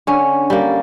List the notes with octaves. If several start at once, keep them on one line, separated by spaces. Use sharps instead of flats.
D3 C#4
G3 A#3